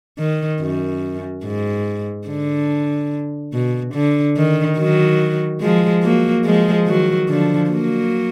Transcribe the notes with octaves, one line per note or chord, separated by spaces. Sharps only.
D#3
F#2
G#2
D3
B2
D3
D#3
D#3 F#3
F3 G#3
F#3 A#3
F3 G#3
D#3 F#3
D3 F3
F#3 A#3